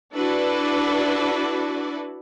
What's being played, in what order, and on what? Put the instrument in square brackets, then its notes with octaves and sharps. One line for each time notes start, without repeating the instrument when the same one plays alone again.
[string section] D4 E4 F#4 A4 B4 D5